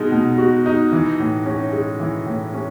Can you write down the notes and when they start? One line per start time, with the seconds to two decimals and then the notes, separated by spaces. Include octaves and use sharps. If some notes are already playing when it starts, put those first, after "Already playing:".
Already playing: B2 G#3 D#4
0.12 B2
0.38 F#4
0.66 D#4
0.92 E3
1.19 A2
1.46 C#4
1.72 G#3
2.00 E3
2.26 A2
2.54 C#4